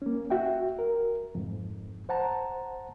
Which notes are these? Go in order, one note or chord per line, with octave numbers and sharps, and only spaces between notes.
A#3 C#4
F#4 E5 G5
A#4
F2 G#2
C5 F#5 A5 A#5